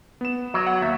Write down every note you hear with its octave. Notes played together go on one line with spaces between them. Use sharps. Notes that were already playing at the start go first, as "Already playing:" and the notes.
B3 E7
F#3
F#5
D#2 E5